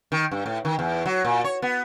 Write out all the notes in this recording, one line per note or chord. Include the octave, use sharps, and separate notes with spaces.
D#3
G2
A2
D#3
E2
F#3
A#2
C#5
B3